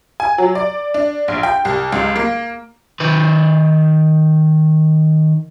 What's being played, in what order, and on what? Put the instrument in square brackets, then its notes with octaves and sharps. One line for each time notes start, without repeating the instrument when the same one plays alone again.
[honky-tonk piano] G#5
F#3
D5
D4
A#1
G5
C2
C#2
A#3
[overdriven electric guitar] D#3 B4